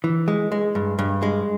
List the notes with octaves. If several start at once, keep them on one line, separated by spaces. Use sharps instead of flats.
E3
G#3
G#3
G2
G2
G#3